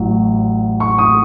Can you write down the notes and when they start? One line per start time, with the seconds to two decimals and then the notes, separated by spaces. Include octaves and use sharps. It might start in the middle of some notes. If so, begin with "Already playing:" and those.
Already playing: A1 A2 F#3
0.80 C#6
0.98 D#6